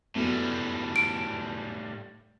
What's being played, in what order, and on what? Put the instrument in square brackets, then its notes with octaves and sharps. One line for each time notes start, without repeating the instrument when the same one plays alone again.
[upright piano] F#2 A3 B3 [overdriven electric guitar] A2 G3
[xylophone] D7